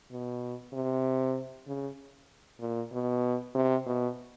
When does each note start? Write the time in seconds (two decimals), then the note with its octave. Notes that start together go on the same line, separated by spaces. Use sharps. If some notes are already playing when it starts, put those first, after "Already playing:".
0.11 B2
0.73 C3
1.67 C#3
2.60 A#2
2.92 B2
3.55 C3
3.86 B2